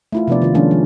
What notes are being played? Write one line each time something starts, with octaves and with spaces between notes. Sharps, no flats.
A3 E4 F4
C3 F3 B3 D4 D5
D#3 F4
D#3 F3 G#3 A#3 C#4 D4
F3